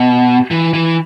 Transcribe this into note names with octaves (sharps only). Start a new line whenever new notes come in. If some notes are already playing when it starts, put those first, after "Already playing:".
Already playing: B2
E3
E3